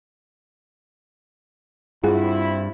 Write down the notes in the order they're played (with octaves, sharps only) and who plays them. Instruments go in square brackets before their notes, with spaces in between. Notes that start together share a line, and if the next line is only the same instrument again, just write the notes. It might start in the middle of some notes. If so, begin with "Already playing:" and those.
[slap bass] G2 [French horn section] C4 E4 [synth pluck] F4 G#4 F#5